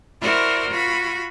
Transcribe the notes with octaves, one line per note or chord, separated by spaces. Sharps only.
E4 F#4 A#4 C5 D5
F4 F#4 B5